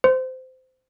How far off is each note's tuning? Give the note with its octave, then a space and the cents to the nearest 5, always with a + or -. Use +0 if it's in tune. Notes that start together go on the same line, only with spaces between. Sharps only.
C5 -20